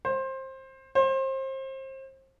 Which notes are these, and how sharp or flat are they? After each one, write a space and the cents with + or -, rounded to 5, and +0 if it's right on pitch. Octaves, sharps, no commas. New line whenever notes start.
C5 +20
C5 +30